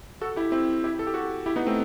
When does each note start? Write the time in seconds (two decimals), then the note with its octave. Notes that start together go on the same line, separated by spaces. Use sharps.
0.21 F#4 A4
0.36 E4 G4
0.52 C4 E4
0.84 E4 G4
0.99 A4
1.07 G4
1.14 F#4 A4
1.46 E4 G4
1.56 B3 D#4
1.66 A3 C4